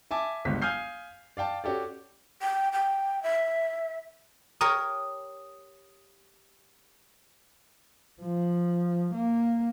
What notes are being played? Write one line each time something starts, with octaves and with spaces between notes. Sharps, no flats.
E5 G#5 A5 D6
G1 C#2 B6
F5 G#5 D#6 F6 G6 C7
D5 F5 G5 A5
C#4 F#4 G4 A4 D5
G5
G5
E5
G4 A#4 C#5 D#6
F3
A#3